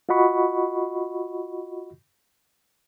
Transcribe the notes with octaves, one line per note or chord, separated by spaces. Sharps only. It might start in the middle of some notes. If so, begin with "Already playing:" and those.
F4 F#4 D#5 F#5 B5 C#6